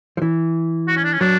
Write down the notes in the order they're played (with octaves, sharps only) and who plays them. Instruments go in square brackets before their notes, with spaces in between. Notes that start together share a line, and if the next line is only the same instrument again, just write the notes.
[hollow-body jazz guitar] F3
E3
[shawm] F#4
C#4
D4
C#4
[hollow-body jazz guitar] F#3 [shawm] D4